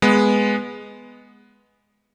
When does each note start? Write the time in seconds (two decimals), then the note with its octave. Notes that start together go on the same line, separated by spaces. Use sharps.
0.02 G#3 B3